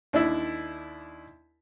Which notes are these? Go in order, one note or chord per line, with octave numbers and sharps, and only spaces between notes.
D#2 D4 E4